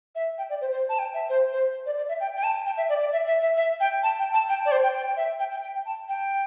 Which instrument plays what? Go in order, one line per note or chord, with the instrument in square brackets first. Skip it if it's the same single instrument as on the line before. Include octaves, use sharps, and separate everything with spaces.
[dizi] E5
G5
D5
C5
C5
A5
G5
E5
C5
C5
D5
D5
E5
G5
G5
A5
G5
E5
D5
D5
E5
E5
E5
E5
G5
A5
G5
A5
G5
D5
C5
G5
G5
E5
G5
G5
G5
A5
G5